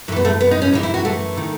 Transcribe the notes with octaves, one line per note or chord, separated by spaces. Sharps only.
F#2 E3 A3 B3
A3
B3
D#4
C#4
F#2 E3 D#4
E4
F#4
A3
D#3